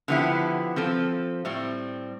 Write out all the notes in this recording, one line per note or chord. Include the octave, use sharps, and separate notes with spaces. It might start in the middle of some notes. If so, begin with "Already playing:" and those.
D3 F3 B3 E4 G4
F3 C4 F4 A4
A2 G3 C4